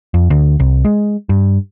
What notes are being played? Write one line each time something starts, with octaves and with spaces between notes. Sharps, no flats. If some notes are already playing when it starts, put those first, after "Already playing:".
F2
D2
C2
G#3
G2